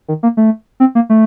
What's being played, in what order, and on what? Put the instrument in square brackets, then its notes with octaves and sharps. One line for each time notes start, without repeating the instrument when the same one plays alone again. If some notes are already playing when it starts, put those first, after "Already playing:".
[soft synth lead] D#3
A#3
A3
C4
A#3
A3